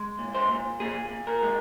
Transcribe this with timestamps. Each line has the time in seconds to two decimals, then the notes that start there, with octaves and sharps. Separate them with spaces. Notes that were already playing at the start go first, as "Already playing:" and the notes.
Already playing: G#3
0.19 A#2
0.35 C5
0.51 A#2
0.80 A#2 G#4
1.11 A#2
1.27 A#4
1.42 G#3